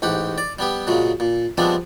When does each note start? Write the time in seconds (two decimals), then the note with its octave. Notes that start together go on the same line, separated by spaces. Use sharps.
0.02 A1 G#2 G4 F#5
0.38 D5
0.59 G3 B3 G4
0.87 A#2 C#3 F#3 G#3
1.20 A#2
1.58 F3 G3 G#3 B3 C4 D4